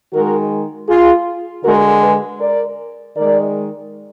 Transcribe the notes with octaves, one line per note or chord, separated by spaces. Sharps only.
D#3 G#3 F#4 A#4
F4 G#4
D3 G#3 F#4 A#4
G#4 B4
A#4 D5
D#3 G#3 A#4 D5